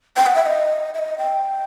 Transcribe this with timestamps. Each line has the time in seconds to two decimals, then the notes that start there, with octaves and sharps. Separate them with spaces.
0.17 G5
0.26 F#5
0.35 E5
0.46 D#5
0.94 E5
0.99 D#5
1.18 G5